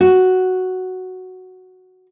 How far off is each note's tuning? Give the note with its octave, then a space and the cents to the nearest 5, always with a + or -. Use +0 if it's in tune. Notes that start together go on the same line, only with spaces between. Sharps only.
F#4 +0